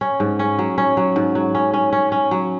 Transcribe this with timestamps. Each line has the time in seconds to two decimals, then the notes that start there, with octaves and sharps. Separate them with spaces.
0.01 C#4
0.20 G#2
0.39 C#4
0.59 F#3
0.78 C#4
0.97 F#3
1.16 G#2
1.35 F#3
1.55 C#4
1.74 C#4
1.93 C#4
2.12 C#4
2.31 F#3